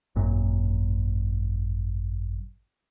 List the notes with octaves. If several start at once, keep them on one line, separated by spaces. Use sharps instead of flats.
G#1 F#2 A#2